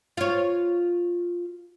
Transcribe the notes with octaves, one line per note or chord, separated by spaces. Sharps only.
F4 C#5